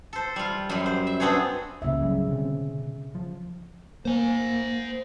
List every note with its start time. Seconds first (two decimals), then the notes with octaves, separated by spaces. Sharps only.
0.13 A4 C5
0.36 G3 F4
0.70 F#2 G3
0.86 C5
1.07 E5
1.20 B3 C4 D4 G#4 C#5
1.82 C#2 C#3 A#3 E5
1.99 G1 F#3 G3
2.27 B2 D3 C4
3.15 F3
4.05 A#3 C5 G#5